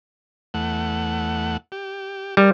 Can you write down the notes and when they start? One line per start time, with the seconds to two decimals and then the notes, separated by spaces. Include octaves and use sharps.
0.54 E2 A3 F#5
1.72 G4
2.37 G3 A#4